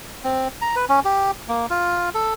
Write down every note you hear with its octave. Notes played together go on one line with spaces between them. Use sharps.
C4
A#5
B4
C#4
G4
A#3
F4
A4